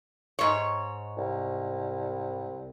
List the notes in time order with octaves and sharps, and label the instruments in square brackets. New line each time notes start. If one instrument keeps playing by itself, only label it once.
[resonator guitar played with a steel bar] G#2 C#5
[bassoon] C2